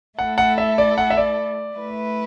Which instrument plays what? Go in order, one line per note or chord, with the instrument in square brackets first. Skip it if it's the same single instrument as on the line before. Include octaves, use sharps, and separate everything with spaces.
[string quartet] A3 E4 A4 [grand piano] F#5
[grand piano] F#5
E5
D5
F#5
E5
D5
[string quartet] A3 E4 B4